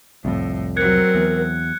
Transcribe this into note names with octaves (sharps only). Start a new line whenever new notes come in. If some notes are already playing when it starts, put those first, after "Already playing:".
C2 F2 A2
F#3 C4 A#4 F#6 G#6 C#7
E2